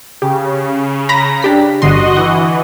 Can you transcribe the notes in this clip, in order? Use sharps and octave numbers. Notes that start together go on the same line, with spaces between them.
C#3 G4
A#5 B5 A#6
D4 G4 B6
G1 D3 F#4 D#5 C6
E3 F#5